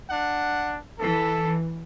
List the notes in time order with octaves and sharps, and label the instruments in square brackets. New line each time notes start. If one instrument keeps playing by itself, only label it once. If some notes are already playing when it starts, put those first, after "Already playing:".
[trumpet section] D4 F#5
[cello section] E3 [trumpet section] A4